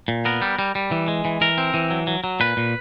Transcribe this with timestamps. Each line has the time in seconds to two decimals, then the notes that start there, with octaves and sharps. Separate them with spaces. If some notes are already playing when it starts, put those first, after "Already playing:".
0.08 A#2
0.25 B3 A#4
0.42 G3
0.59 G3
0.75 G3
0.91 E3
1.08 G#3
1.25 E3
1.41 E3 A#4
1.58 C4
1.74 E3
1.90 F#3
2.07 F#3
2.24 F#3
2.40 A#2 B4
2.57 A#2